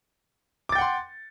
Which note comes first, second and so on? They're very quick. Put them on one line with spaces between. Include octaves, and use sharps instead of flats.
D6 A6 G5 F#5 C6